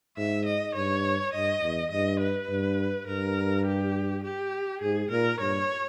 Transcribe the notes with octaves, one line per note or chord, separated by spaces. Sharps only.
G#2 E5
D#5
G2 C#5
G2 D#5
E2
G2 D#5
B4
G2
G2 A#4
G4
G4
G#2 G#4
A#2 A#4
G2 C#5